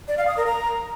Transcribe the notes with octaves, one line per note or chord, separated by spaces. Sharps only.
D5
F5
D#6
A#4
A#5